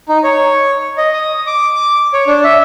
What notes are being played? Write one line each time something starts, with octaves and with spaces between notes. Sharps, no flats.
D#4
C#5
D#5
D#6
D6
C#5
D4
E5